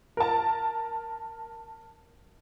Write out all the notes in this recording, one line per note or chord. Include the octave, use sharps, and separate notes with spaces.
A#4 A5